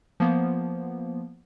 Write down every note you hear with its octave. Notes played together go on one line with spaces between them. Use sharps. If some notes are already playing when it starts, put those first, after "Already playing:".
F3 A#3 B3